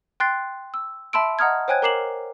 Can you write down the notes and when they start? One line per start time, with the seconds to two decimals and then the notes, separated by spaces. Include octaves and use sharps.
0.20 G5 C6 F#6 A6 C7
0.74 E6
1.13 E5 A5 B5 C6 E6 D7
1.39 D#5 F#5 A#5 D#6 F6 G#6
1.68 C5 C#5 G5 G#5 F#6 G#6
1.82 A#4 A#5 D6 C7 E7 F#7